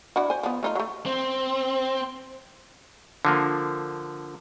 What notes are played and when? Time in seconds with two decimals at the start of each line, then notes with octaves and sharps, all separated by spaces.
0.16 D4 E4 F#4
0.30 C5 G#5
0.43 F3 B3
0.63 A3 D#4 F4
0.75 F#3 A3
1.06 C4
3.25 D3 F3 A#3